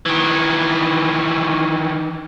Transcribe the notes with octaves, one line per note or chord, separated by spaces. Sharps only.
D#3 E3